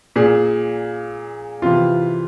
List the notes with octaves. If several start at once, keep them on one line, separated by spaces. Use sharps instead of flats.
A#2 G#4
C3 E3 F4